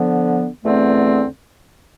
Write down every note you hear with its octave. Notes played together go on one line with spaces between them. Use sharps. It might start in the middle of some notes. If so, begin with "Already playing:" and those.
Already playing: D3 F3 B3
E2 D3 A3 C4